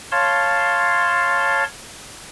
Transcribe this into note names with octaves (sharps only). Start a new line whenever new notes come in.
C#5 F5 A5 C6